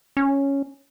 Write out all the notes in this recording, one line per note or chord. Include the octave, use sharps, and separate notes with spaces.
C#4